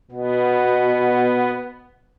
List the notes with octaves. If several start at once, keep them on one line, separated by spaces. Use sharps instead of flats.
B2 B3